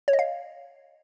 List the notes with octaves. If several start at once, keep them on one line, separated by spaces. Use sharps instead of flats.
C#5
D#5
F5